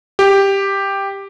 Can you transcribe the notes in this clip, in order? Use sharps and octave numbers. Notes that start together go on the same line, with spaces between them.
G4